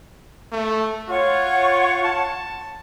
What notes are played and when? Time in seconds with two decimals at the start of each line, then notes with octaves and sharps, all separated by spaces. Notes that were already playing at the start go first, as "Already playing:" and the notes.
0.52 A3
1.09 F4 C#5 F#5 C#6
2.04 A5